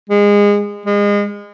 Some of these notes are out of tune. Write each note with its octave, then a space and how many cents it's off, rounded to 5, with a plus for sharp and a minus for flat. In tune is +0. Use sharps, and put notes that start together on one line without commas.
G#3 -25
G#3 -30